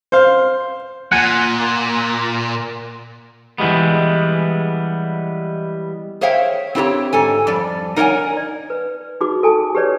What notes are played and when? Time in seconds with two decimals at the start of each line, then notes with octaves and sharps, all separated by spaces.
0.12 C5 F5
1.12 A#2 F#5 G#5
3.58 E3 G3 G#3 B3
6.21 G#4 C5 C#5 E5 F5 G5
6.75 C4 E4 G4 A4 C#5
7.13 G#2 A4 G#5
7.47 F2 G3 D5
7.96 D#4 A#4 C#5 D5 F#5 G#5
8.37 D5
8.70 B4
9.21 D#4 F#4 G#4 B4 D6
9.43 A4 G#5 A5
9.75 G4 G#4 B4 C#5 D5